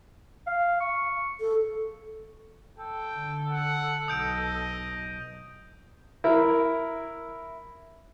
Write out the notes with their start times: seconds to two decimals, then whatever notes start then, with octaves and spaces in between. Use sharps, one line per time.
0.47 F5
0.80 C#6
1.40 A4
2.79 A4 G5
3.13 D3
3.49 F#5
4.08 B1 D#5 D#6 G6 D7
6.24 E4 A#4